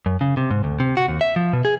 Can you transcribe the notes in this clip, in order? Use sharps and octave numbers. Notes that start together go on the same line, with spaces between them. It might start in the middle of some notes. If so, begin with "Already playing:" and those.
F#2
C#3
C3
G#2
D2
C3
F#4
D#2
E5
F3
B2
G#4